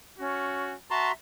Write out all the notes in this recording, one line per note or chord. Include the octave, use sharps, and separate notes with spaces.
C#4 F#4
F#4 E5 A5 A#5 C6